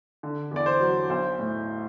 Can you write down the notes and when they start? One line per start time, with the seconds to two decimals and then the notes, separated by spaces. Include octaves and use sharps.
0.23 D3
0.51 E2 D5
0.66 C5
0.80 F#3
1.09 B1 C5
1.39 A2